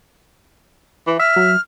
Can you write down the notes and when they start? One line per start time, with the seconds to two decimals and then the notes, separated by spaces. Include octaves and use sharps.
1.07 E3
1.20 E5 F6
1.36 F#3